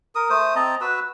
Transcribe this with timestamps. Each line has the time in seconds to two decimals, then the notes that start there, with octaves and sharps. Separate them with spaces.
0.15 A#4 D#6
0.30 A3 C5 D#6
0.56 C4 D#5 A5 A#5
0.81 F#4 B4 E6